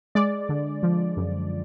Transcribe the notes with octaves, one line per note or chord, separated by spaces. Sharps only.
G#3 D5
D3
F3
F#2